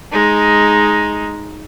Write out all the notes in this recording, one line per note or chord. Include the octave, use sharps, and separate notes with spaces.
G#3 D#4